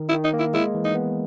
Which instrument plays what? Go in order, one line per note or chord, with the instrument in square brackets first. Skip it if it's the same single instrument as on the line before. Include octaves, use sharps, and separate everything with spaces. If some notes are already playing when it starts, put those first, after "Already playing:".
Already playing: [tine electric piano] D#3
[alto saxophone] E4
[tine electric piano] D#3
[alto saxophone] D#4
[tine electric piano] A#3
[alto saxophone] E4
[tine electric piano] G#3 [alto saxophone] E4
[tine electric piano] E3
[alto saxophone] D#4
[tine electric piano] B3